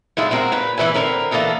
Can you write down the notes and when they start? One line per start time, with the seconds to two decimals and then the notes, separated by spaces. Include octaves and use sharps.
0.17 A#2 F#3 G#3 E4 A4
0.31 G#3 C4 F#4 A#4
0.52 A#2 B4
0.77 G#2 E3 A#3 B4 E5 G#5
0.94 D3 C4 A#4 B4
1.31 E3 A#3 B3 A4 D#5